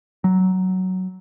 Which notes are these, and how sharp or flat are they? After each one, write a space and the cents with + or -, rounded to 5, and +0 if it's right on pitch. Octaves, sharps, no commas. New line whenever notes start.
F#3 +10